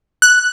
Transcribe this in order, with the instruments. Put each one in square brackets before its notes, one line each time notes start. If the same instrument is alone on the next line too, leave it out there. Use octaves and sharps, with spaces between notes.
[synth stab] F#6